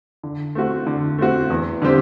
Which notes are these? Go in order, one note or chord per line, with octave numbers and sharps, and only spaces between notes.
D3
A3 C4 F#4
D3
A3 C4 F#4
E2
D3 G3 C4 G4